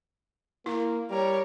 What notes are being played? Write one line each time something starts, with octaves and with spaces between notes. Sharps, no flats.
A#3 E4
G3 A#4 C#5